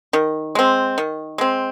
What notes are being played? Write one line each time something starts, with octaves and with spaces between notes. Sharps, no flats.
D#3
G#3 C4
D#3
G#3 C4